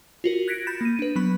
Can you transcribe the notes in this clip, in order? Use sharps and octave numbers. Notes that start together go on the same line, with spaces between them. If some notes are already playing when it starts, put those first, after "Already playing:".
F4 F#4 A#4
F#6 G#6 A#6 B6 C#7 D7
B5 G6 A6 A#6 E7
A#3 D#7
D4 B4
F#3 B3 B5